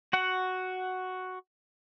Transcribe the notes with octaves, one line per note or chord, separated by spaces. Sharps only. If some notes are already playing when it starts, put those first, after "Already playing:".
F#4 F#5